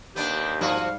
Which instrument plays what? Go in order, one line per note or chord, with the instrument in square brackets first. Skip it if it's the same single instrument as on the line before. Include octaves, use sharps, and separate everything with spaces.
[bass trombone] D#2 [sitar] B3 D4 [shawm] G4
[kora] G#2 G3 [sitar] F3 F#4 [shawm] F5